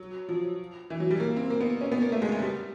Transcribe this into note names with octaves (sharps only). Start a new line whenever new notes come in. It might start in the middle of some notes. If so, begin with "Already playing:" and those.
Already playing: F#3
F3
E3
F#3
G3
A#3
C4
A#3
B3
C#4
B3
A#3
A3
G#3
G#3
G3